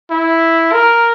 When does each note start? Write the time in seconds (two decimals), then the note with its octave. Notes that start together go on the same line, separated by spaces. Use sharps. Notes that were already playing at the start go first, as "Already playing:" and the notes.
0.10 E4
0.73 A#4